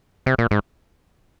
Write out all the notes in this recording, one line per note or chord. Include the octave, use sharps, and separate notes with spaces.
C3
A#2
G#2